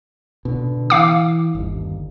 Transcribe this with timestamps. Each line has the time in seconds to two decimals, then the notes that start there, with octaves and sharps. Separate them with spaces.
0.45 B2 D3
0.90 E3 F5 D6
1.55 G1 D#2